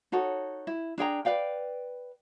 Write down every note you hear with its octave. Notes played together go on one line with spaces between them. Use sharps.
D#4 F#4 A4 C#5
E4
D4 G#4 G5 A#5
B4 D5 F5 G5